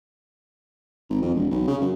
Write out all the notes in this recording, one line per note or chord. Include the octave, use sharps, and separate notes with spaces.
G#1
F2
E1
B1
C#3
F#2